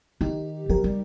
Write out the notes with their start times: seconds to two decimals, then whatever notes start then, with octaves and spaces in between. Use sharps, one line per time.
0.21 D#3 D#4 G4
0.69 F3 G4 A#4
0.84 G3